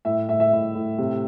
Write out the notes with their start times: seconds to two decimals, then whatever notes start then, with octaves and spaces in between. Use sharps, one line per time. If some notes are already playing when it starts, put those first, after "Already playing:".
0.05 A2 E5
0.29 A2 E5
0.40 E5
0.53 A2
0.75 A2
0.98 C3